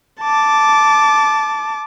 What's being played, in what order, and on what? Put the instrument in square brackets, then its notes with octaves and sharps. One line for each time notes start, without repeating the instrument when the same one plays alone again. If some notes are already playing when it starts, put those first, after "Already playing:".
[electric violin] A5 D6